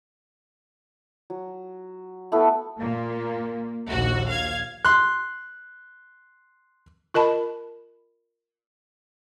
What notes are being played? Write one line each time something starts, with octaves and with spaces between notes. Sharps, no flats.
F#3
A3 B3 E4 A4
A#2 A#3
A#1 D#2 F#4
F5 G#6
C6 F#6
F4 A#4 D#5 A5 B5